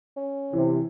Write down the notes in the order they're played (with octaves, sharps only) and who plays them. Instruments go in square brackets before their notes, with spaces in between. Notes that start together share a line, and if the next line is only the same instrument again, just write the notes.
[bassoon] C#4
[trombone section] C3 [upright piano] E3